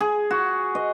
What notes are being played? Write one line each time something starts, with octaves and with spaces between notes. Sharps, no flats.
G#4
F#4
D#5